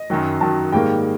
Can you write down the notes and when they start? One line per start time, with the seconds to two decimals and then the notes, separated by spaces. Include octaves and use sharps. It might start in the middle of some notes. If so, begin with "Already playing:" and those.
Already playing: D#5
0.10 F#2 D#3 F#3
0.41 F#2 D#3 F#3 A5
0.72 G#2 D#3 G3 A#3 G5